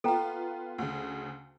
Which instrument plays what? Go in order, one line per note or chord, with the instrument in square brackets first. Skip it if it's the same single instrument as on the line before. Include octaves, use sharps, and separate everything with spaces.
[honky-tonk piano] B3 F4 [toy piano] A4 G5 A#5
[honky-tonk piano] D2 C#3